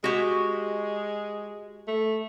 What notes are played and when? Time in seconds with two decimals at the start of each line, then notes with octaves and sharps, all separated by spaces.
0.04 G#3 F#4 G4
1.88 A3